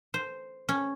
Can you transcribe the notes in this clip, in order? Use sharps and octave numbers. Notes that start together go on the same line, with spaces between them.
C5
C#4